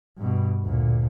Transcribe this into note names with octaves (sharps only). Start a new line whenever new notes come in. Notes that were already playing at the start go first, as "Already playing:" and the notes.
G2 B2
D2 A#2